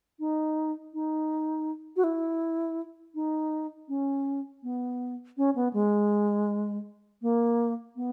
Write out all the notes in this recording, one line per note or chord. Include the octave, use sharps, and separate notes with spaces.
D#4
D#4
F#4
E4
D#4
C#4
B3
C#4
B3
G#3
A#3
B3